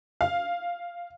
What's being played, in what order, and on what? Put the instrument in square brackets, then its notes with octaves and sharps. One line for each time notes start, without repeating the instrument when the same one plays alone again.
[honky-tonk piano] F5